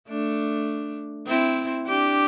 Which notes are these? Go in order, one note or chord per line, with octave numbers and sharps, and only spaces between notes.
A3 D4
C4 E4
D4 G4